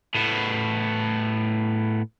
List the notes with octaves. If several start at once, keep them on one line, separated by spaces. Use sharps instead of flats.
A2 B3